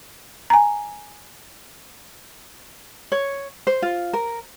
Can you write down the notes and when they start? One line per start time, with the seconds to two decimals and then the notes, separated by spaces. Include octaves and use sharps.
0.50 G#5 A#5
3.12 C#5
3.67 C5
3.82 F4
4.13 A#4